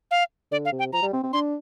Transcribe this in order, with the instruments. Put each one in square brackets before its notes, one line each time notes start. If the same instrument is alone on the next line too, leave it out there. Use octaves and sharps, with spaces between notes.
[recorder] F5
[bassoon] D3 [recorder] D5
[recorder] F5
[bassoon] C3
[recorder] G5
[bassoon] F3 [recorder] A#5
[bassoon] G3
C4
C4
[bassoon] D4 [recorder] C6